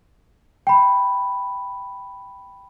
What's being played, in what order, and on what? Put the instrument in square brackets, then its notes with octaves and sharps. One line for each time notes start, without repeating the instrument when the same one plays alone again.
[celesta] G5 B5